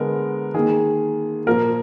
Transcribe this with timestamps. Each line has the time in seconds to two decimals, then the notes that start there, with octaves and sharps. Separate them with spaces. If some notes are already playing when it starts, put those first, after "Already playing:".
Already playing: D3 G#3 B3 A#4
0.54 D#3 A#3 G#4
1.46 A#2 F3 A#3 A#4